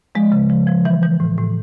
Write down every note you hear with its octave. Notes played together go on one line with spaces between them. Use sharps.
F3 G#3
C#3
F3
F3
E3
E3
A2
A2